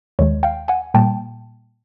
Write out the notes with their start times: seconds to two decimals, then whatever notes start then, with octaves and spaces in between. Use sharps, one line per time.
0.19 D#2 D#3 G#3 C#5
0.43 F5 G5
0.68 F#5 G#5
0.94 A#2 G3 A#3 G5 A5